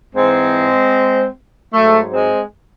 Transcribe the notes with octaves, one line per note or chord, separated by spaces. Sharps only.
G#2 E3 G#3 C4
G#2 F#3 A3
G#3 C4